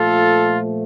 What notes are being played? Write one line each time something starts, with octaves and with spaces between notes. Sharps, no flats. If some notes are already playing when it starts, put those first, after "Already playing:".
Already playing: A#2 F3 A3 F4 A4